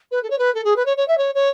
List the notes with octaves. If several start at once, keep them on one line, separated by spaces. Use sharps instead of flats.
B4
A4
C#5
B4
A4
G#4
B4
C#5
C#5
E5
C#5
C#5